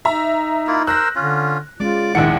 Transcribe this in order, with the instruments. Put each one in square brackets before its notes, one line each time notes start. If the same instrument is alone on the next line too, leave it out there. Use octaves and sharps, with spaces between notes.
[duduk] D#4 [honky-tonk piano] E5 A#5
[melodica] A#3 E4 F4
[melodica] A#4 C5 E6 [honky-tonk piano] F#6 A#6
[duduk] D3 [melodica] C#4 F4
[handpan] G#3 C#4 [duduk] F4 [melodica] D5 D6
[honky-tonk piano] A#1 D#2 C#7 [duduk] D#3 [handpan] E4 F#5